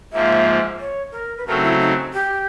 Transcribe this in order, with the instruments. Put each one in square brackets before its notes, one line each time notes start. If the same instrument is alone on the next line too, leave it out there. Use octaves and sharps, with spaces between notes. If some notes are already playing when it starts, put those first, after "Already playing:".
[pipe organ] G#2 F3 A#3 [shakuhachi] E5
[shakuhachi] C#5
A#4
B4
[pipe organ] C#3 F#3 A3 C4 [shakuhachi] A#4
[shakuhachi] D#4
E4
D#4
G4